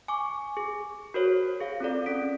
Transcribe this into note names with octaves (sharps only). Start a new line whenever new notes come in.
G#5 C#6 D6
G#4
F#4 A#4 C5 C#5
G#4 F5
C4 F4 A4 D5
C#4 B6 D7